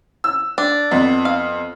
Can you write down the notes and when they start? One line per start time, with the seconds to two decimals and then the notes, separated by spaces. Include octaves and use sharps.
0.24 E6
0.58 D4
0.91 F2 B3
1.25 F5